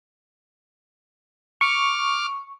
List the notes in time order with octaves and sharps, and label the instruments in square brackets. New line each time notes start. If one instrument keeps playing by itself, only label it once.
[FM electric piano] C#6 [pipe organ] D6 F6